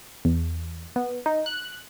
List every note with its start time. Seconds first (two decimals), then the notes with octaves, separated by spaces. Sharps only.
0.25 E2
0.96 B3
1.26 D#4
1.46 F#6